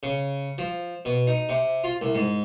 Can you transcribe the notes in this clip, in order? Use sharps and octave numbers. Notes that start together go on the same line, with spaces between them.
C#3
F3
B2
D#4
C3
F4
C2
G#2